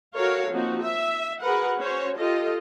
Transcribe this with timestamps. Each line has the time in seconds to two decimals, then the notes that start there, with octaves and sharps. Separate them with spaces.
0.15 F#4 A4 A#4 C#5 F5
0.50 F3 A#3 C4 D#4 F#4
0.82 E5
1.41 F#4 G#4 A#4 B4 F#5
1.78 C#4 F#4 C5 C#5
2.17 F4 G4 A4 D#5